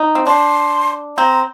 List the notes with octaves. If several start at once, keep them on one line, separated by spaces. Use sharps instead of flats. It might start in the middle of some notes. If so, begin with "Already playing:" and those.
Already playing: D#4
C4
D4 C6
C4 A#5